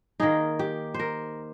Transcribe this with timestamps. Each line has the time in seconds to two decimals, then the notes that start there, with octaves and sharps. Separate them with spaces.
0.20 D#3 A#3 D#4 G#4
0.59 G4
0.94 C5
0.99 A#4